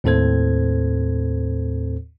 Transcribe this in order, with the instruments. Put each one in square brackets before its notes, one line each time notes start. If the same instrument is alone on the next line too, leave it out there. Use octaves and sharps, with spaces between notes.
[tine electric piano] D#2 A2 C4 A4 C5 G#6